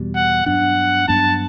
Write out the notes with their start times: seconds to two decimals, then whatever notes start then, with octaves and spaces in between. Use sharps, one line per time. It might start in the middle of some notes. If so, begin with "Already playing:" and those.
Already playing: E2 B2 G3
0.15 F#5
0.46 G2 F#3 B3 D4 F#5
1.08 G2 F#3 B3 D4 A5